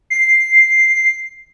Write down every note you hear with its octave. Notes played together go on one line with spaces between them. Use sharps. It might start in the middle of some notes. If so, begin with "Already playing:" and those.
C7